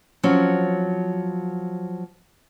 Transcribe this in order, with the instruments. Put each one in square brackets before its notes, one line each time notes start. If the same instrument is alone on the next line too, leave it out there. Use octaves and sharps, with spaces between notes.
[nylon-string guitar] F3 F#3 C4 C#4